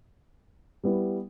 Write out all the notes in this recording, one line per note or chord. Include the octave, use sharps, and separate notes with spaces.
G3 B3 E4